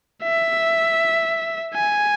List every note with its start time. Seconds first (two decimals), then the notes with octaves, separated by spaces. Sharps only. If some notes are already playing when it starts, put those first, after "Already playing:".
0.23 E5
1.74 G#5